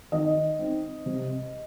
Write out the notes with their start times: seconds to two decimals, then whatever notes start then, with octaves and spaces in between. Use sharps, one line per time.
0.12 D#3 D#5
0.59 C4 D#4
1.06 C3